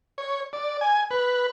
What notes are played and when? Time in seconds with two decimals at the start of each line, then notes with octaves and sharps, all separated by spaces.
0.18 C#5
0.53 D5
0.81 G#5
1.11 B4